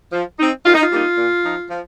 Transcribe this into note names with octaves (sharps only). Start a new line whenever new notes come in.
F3
C4 D#4
D#3 F4
D#4
F4
G3 A#3 D#4
A#2
F3 D#4
F3